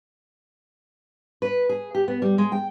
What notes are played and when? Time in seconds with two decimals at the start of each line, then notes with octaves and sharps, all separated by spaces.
1.42 B4
1.69 G#4
1.95 G4
2.08 B3
2.22 G3
2.38 G#3
2.52 G5